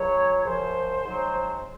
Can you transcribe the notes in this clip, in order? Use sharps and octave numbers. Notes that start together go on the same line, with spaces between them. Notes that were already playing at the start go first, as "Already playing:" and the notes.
Already playing: C#2 C#3 F#3 C#5
C#5
F#2 C#3 F3 C5
G#2 F#3